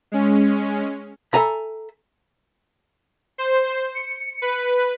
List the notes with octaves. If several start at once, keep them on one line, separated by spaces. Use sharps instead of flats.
G#3 C#4
A4 E5 G#5 A#5 B5
C5
C#7
B4